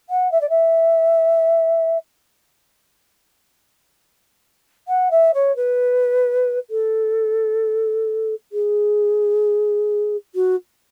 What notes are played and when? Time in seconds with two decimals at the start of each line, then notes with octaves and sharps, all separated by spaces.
0.09 F#5
0.31 E5
0.41 D5
0.49 E5
4.88 F#5
5.11 E5
5.34 C#5
5.56 B4
6.70 A4
8.52 G#4
10.34 F#4